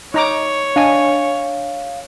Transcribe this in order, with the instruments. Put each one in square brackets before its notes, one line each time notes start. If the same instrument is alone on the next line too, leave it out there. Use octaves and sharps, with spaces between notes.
[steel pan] D#4 A#5 D6 [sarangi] C#5
[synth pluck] D4 D#5 G#5 [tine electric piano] F5